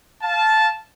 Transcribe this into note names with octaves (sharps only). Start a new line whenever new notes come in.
F5 A5